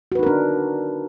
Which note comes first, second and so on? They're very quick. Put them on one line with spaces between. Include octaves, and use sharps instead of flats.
F#4 B4 D#4 A#4 D4